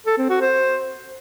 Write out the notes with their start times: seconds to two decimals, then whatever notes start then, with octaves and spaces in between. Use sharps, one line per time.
0.06 A4
0.18 C4
0.29 F#4
0.41 C5